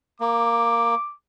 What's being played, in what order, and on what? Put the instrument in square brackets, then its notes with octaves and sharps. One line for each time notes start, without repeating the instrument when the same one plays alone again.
[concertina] A#3 [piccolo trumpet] D6